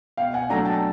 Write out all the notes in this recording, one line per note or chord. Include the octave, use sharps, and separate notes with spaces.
B2 F5 G5
F#5 G#5
F#3 A3 D4 G#5 A#5
G5 A5